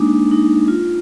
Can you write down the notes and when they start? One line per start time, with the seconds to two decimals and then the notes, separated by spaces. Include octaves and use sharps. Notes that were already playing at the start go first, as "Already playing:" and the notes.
Already playing: G#3 A#3 D4 D#4
0.31 D#4
0.68 F4